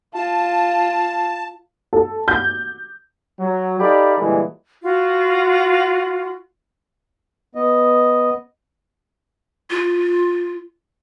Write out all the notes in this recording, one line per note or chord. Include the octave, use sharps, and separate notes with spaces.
F4 A5
A4
G6
F#3
D#4 G4 A4 D5 F5 B5
A#2 D3 E3 G3 G#3
F4 F#4
B3 D#5
F4